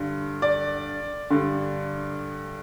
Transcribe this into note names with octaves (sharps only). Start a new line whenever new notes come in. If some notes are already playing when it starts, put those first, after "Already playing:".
Already playing: G2 D3
D5
G2 D3